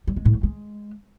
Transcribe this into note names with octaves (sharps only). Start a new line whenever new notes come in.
G3
G#3
A2
F#3
G#3